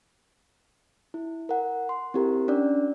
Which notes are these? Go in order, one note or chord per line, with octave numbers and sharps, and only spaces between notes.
E4
A#4 F#5
C6
C4 E4 G4 A#4
C#4 D4 D5